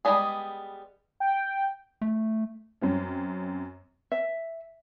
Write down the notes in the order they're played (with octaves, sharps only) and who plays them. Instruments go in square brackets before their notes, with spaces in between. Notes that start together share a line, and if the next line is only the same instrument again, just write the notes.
[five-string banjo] G3 G#3 B3 D4 G#4
[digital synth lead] G5
[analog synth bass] A3
[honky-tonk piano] F#2 C4 C#4
[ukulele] E5